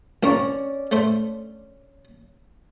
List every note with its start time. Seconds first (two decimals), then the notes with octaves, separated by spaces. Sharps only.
0.23 C2 C#4 A#4 D5 C#6
0.91 A3 C5 E5